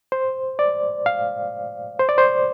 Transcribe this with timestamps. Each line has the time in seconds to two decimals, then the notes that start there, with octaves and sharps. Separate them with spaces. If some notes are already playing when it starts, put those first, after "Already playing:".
0.12 C5
0.59 D5
1.06 F5
1.99 C5
2.09 D5
2.18 C5